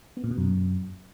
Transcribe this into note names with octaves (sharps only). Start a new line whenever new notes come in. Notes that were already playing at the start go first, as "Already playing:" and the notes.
B3
A#2
B2
F#2